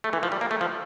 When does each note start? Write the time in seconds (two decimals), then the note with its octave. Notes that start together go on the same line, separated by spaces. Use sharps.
0.04 A3
0.13 E3
0.23 F3
0.32 G3
0.41 A#3
0.51 A3
0.61 F3